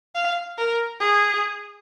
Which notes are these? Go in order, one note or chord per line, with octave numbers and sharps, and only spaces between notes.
F5
A#4
G#4